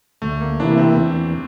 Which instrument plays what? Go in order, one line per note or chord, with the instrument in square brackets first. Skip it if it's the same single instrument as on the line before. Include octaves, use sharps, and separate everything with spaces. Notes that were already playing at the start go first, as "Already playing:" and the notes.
[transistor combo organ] D2 [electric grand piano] A3
[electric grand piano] A#3
[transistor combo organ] C3 E3 A#3 E4 [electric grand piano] D4
[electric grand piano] C4
[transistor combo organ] E2